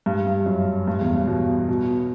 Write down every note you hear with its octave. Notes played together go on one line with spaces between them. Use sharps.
G2
G2
F#2
G2
E2
G2
B2
B2